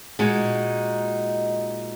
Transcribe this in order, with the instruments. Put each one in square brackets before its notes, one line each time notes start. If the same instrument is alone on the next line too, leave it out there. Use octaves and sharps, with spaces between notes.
[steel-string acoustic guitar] A#2 G#3 D#4 F#4